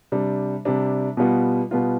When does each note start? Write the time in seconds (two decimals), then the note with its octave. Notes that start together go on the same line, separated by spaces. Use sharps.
0.12 C3 G3 D4
0.65 C3 G3 D4
1.17 B2 G3 B3 F4
1.71 B2 G3 B3 F4